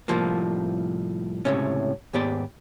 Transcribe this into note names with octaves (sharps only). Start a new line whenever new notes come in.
C2 F2 A2 F3 A#3
C#2 F#2 A2 C3 C#4
D#2 G#2 B3 G4 D5